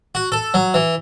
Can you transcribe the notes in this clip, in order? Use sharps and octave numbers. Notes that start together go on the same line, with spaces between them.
F#4
A4
F#3
E3